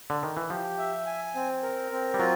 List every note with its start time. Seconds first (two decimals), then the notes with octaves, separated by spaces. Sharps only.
0.10 D3
0.23 D#3
0.37 E3
0.50 F3 G4
0.78 E5
1.06 G#5
1.35 C4
1.63 A#4
1.91 C4
2.14 G3
2.19 F#3 F4